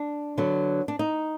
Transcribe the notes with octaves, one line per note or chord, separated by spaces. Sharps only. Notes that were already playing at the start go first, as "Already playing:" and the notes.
Already playing: D4
D3 F#3 B3
D4
D#4